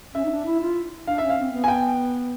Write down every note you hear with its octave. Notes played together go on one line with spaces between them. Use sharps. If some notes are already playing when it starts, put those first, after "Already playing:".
C#4 E5
D#4
D4
E4
F4
D4 F5
C#4 E5
F5
C4
B3
G#5
G5